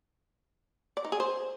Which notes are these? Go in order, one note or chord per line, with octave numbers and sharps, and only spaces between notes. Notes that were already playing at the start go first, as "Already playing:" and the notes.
D5
D#4
G#4
C5